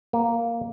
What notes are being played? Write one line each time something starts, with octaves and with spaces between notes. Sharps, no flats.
A#3